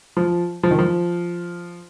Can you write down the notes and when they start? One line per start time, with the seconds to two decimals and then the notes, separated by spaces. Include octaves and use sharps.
0.17 F3
0.63 F3
0.71 D#3
0.79 F3